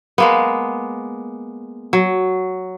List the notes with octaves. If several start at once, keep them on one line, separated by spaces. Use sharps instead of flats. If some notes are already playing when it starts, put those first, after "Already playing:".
G#3 A#3 B3
F#3